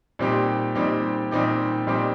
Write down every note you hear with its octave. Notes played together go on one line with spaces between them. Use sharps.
A#2 G3 C4 D#4 G4
A#2 G3 C4 D#4 G4
A#2 G3 C4 D#4 G4
A#2 G3 C4 D#4 G4